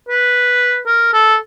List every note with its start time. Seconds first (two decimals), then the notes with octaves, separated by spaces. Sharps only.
0.09 B4
0.86 A#4
1.13 A4